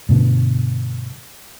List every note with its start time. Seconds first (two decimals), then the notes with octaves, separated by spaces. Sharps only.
0.09 G2 B2 D3